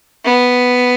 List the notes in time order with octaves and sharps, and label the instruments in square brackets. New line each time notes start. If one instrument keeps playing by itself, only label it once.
[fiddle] B3